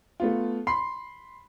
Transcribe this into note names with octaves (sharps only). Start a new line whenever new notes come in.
A3 B3 F4
B5 C6 C7